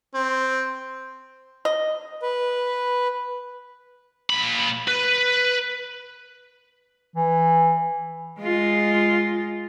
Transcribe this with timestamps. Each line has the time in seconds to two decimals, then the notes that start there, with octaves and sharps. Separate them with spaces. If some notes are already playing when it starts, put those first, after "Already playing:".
0.14 C4
1.65 D#5
2.22 B4
4.30 A#2 B5
4.88 B4
7.16 E3
8.39 G#3 F4